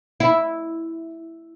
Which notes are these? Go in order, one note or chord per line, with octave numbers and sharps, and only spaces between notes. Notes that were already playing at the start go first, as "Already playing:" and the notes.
E4